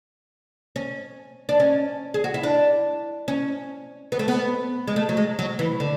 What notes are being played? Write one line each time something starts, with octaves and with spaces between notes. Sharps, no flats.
C#4
D4
C#4
G#4
F#4
E4
D4
C#4
B3
A3
B3
G#3
A3
F#3
G#3
F#3
E3
D3